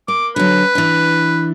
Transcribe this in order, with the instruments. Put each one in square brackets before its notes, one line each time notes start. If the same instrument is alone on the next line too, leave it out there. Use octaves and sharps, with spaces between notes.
[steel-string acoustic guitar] A#3 [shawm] D6
[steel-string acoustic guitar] D3 F#3 [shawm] B4
[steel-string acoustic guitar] E3 D4